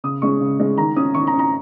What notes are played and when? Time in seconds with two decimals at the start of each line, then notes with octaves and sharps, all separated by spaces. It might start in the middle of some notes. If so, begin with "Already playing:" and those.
0.04 C#3 D#6
0.22 G#3 C#4 C#6
0.41 C#3
0.60 G#3 C#4
0.78 D#3 A#5
0.96 C#4 D#6
1.14 D#3 C#6
1.27 A#5
1.33 C#4
1.39 A#5